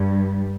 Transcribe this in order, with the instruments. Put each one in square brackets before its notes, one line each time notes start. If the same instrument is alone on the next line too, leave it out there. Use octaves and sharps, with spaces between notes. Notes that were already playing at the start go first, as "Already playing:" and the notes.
Already playing: [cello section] G2 G3